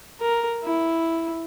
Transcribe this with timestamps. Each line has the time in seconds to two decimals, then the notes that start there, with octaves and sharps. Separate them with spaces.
0.21 A#4
0.63 E4